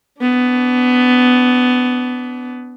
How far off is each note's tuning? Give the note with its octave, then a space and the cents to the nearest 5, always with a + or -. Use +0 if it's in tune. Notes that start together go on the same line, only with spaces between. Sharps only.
B3 +15 D4 -25